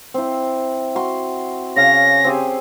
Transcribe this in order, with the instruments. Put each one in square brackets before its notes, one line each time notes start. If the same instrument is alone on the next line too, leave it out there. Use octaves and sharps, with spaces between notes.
[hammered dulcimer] C4 E4
F#4 C6
[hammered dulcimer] C#3 F5 [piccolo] A#6
[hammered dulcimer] C4 G4 G#4